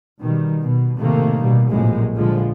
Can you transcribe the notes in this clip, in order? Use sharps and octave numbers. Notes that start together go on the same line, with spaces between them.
B2 D#3 G3
B2
A2 C3 D#3 A3 A#3
B2 G3
A#1 F#2 A2 C3 G#3
A#1 D3 F3 G#3